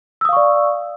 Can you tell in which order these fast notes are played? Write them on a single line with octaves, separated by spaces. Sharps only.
E6 D#6 F5 C#6 D5